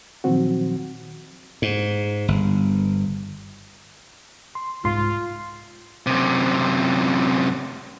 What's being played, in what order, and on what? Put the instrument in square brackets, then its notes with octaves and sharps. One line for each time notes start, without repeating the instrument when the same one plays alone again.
[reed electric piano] A#2 D#3 F3 F#3 C4 F#4
[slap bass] G#2
G1
[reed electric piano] C6
[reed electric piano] C2 G#2 C6 [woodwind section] F4
[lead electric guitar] F#2 C3